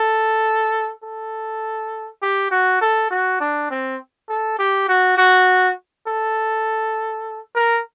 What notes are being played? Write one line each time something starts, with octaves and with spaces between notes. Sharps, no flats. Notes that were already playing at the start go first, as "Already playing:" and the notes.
Already playing: A4
A4
G4
F#4
A4
F#4
D4
C4
A4
G4
F#4
F#4
A4
A#4